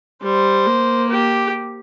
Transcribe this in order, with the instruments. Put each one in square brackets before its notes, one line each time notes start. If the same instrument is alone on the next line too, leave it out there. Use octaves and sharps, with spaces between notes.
[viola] G3 [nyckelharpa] C5
[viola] A#3
[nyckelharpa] G4